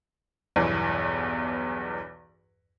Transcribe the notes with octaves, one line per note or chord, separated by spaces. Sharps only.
B1 E2 G2 E3